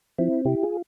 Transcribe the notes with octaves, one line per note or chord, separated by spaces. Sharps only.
F3 C4 E4
C3 E4 G4
F4 G#4